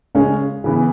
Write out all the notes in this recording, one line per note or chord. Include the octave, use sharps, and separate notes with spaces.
C#3 G#3 C#4
C#3 E3 B3